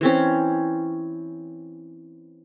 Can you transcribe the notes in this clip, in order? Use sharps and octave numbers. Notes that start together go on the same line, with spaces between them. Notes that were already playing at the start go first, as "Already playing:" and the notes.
E3 C4 C#4